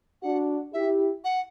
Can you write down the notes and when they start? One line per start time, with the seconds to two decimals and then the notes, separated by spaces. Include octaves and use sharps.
0.22 D4 F#4 F#5
0.73 E4 G4 E5
1.24 F#5